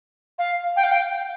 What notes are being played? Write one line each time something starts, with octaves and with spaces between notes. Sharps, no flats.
F5
G5
F5
G5